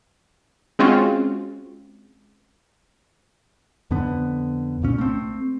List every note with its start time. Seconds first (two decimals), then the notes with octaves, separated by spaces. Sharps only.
0.79 G#3 C4 C#4 F4 F#4
3.91 F2 D3 B3
4.82 C2 A#2 C#4
4.98 A3 C4